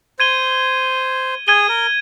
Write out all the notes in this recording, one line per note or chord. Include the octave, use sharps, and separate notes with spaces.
C5 G#6 D#7 G7
G#4 G#6 D#7 G7
A#4